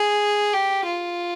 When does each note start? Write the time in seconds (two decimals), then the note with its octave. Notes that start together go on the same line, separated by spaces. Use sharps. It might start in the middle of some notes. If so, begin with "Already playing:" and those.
Already playing: G#4
0.53 G4
0.86 F4